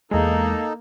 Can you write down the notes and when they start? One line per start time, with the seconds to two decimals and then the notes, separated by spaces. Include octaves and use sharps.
0.11 E2 G#3 A#3 D#4 A4